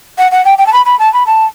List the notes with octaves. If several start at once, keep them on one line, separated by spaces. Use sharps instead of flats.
F#5
F#5
G5
G5
A5
B5
B5
A5
B5
A5